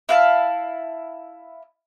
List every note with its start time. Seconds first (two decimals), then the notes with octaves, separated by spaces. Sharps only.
0.09 E4 F5 A5